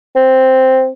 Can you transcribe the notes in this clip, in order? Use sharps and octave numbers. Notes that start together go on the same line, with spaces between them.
C4